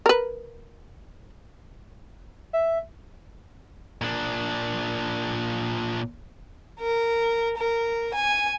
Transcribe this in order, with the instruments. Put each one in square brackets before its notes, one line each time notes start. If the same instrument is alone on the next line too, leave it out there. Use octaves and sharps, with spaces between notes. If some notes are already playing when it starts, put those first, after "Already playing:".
[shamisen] A#4 B4
[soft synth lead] E5
[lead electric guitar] A#2 D4
[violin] A#4
A#4
G#5